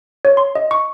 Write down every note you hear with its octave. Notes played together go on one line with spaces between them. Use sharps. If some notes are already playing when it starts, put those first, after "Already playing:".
C#5
C6
D#5
C#6